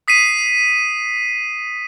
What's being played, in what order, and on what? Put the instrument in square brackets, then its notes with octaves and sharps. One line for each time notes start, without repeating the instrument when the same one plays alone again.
[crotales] D#6 B6 C7 D#7